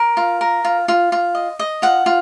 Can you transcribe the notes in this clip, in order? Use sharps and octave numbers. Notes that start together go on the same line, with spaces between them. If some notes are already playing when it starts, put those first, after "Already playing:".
Already playing: A#4
F4
A#4
F4
F4
F4
D#5
D#5
F4 F#5
F4